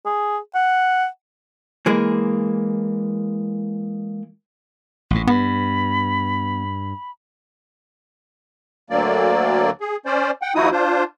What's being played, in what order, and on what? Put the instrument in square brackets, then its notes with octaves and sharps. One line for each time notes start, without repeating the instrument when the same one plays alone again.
[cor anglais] G#4
F#5
[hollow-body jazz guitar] E3 G#3 A#3
[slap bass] A1 G#2
[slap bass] G2 [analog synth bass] B3 [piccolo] B5
[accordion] D2 D3 F#3 A#3 D5
G#4
C#4 C5 D5
F#5 G5
D#2 F3 D#4 E4 F#4 D#6
D4 F4 C5